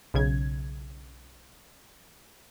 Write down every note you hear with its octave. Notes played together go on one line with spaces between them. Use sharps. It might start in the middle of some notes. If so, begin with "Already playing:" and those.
B1 C#3 G#6